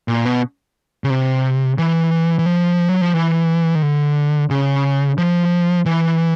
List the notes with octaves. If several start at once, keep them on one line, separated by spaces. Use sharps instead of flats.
A#2
B2
C#3
C3
E3
E3
F3
F#3
F3
E3
D#3
D3
C#3
F3
E3